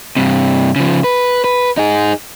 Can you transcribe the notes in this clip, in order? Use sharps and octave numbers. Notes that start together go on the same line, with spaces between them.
G2 C3
C#3 F3
B4
B4
D#4 G#4